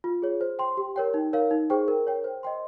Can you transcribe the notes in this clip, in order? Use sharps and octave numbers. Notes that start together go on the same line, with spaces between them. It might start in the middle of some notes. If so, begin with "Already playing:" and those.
F4
G#4 C#5
C5
G5 C6
G4
A#4 C#5 G5
D#4
A#4 C#5 F5
D#4
G#4 C5 G5 C#6
A#4
C#5 G5
C5
D#5 G5 C6